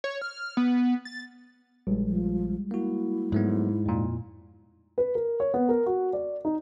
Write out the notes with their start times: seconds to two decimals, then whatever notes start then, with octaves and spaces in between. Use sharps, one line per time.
0.04 C#5
0.22 F6
0.57 B3
1.05 A6
1.87 A#1 G3 G#3
2.07 F3
2.71 A#3 E4 F#4
3.32 G#2 F#3 A3 B3
3.86 F2 A#2
4.98 B4
5.15 A#4
5.40 C#5
5.54 B3
5.69 A#4
5.86 F#4
6.13 D5
6.45 D#4